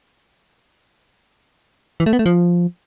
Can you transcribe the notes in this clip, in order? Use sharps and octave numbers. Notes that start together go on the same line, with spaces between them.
E3
A3
B3
A3
F3